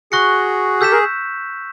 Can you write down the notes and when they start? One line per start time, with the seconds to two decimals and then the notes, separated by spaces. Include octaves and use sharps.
0.12 F#4 G#4 C#6 F#6 A#6 C#7
0.80 G4 A4 E6 G6 B6 E7
0.92 G#4 A#4